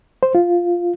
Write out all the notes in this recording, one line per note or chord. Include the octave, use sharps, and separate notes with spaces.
C5
F4